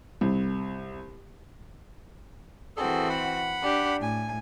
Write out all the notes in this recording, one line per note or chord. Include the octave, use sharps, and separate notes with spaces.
C2
E3 C4 F#4 G#4 A4
F#5 B5
D4 G4
A2 G#5